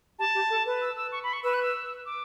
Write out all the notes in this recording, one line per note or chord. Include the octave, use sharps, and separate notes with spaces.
G4 A5
G4
A4
B4
E6
E6
C#6
B5
C#6
B4 E6
F#6
E6
D6